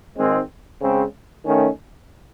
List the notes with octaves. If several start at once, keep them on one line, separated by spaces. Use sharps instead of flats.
G#1 G#2 D#3 G#3 C4
C#3 G#3 C4
D#3 A3 C#4